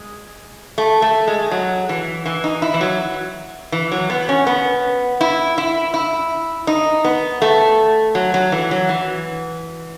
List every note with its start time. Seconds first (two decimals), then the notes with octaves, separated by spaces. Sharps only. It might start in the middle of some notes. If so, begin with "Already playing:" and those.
Already playing: G#3
0.78 A3
1.02 A3
1.28 G#3
1.51 F#3
1.89 E3
2.26 E3
2.44 D#4
2.62 E4
2.74 E3
2.81 F#3
3.72 E3
3.92 F#3
4.10 B3
4.29 C#4
4.47 B3
5.21 E4
5.58 E4
5.94 E4
6.67 D#4
7.05 B3
7.42 A3
8.15 F#3
8.34 F#3
8.52 E3
8.71 F#3
8.89 E3